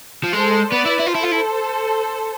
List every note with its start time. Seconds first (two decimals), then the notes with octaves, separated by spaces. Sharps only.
0.23 F3
0.32 G#3 A4 C5
0.71 B3 B4 D5
0.86 E4
0.99 E4
1.06 F4
1.11 E4 A4 C5
1.23 F4
1.31 E4